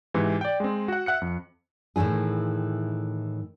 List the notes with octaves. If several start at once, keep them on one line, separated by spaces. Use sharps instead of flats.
G#2 C3 E3
D5 G5
G#3 C4
F#4 F#5
E5 F#5 F#6 C#7
F2
A2 D#3 E3 E4 G#4